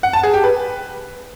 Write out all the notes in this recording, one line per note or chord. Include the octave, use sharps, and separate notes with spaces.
F#5
A5
G#4
G4
B4